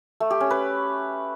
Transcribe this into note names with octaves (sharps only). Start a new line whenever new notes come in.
A3
G4
C#4
B4